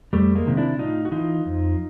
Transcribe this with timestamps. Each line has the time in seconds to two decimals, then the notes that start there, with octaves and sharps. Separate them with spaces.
0.13 F2 G3 A3
0.35 G#3 A#3
0.46 C3 D#3
0.57 D4 E4
0.79 A2 D#4 F4
1.05 F#4
1.11 E3 D#4 F4
1.45 F2